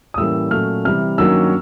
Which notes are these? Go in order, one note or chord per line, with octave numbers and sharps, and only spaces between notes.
D#6
A2 E3 G3 A#3 C#4 E6
A#2 F#3 A3 C#4 F6
C3 E3 G3 F6
G2 D#3 F#3 A#3 C#4 E6